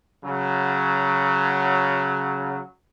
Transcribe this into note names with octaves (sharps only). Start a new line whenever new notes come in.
C#3 F#3